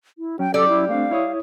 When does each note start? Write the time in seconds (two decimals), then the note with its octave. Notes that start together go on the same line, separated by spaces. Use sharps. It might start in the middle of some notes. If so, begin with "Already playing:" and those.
0.18 E4
0.39 F#3 C#4 G5
0.54 G3 A4 D5
0.68 E4
0.89 A3 C4 D4 F5
1.11 E4 C#5 D#6